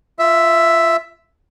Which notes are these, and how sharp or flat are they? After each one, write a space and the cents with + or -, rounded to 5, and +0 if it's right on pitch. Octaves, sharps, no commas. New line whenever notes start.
F4 -20 E5 +5